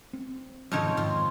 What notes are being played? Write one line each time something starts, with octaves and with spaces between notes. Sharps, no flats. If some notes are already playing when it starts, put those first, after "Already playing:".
C4
F2 G#2 C3 D#3 F3 C#5
G#2 F4